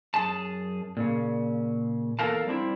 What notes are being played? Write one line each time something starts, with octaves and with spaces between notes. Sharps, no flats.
F#2 G#4 A5
A#2 C#3
E2 A4 A#4 F5 A5
G3 C4 D4 E4